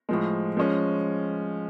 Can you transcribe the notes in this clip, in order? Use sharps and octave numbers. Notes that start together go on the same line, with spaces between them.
A2 F3 G#3
F3 G#3 C#4